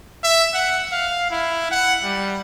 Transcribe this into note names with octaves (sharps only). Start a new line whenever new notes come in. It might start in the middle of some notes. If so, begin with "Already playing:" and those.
E5
F#5
F5
E4
F#5
G3